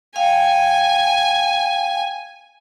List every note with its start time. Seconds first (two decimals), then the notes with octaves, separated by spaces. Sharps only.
0.16 F5 G5 G#5